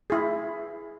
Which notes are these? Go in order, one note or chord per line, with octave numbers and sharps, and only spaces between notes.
E4 G#4